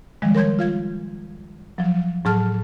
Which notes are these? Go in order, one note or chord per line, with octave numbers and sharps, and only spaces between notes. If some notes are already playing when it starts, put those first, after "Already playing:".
D#3 F3 G3 G#3
A#4 C#5 C6 G6 G#6
F4 F5 G#6
F3 F#3
A2 F#3 G#4 A5 F6